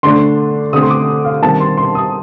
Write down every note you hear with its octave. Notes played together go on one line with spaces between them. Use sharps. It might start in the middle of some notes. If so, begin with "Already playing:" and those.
D3 A3 D4 C6
D3 A3 C4 D#6
C6
D6
F5
D#3 G3 C4 A5
C6
C6
D#6